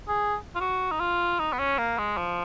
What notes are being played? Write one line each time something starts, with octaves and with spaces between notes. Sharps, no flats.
G#4
F4
F#4
D#4
F4
D#4
B3
C#4
A#3
G#3
F3